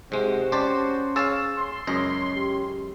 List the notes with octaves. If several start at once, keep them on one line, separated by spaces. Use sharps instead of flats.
G#2 C3 G#3 F#4 C5
C#4 G4 D5 A5 C6
G#4 C#5 F5 E6 A6 E7
C6
C#2 F#2 C#4 D#5
G4